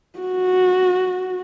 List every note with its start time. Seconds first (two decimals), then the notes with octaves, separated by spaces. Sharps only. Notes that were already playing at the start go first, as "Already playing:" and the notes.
0.19 F#4